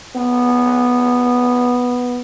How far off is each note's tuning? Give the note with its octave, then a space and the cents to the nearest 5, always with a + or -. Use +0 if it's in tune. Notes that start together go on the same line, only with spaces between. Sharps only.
B3 -5